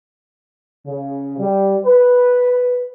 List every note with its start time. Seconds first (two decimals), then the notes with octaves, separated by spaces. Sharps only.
0.86 C#3
1.39 G3
1.85 B4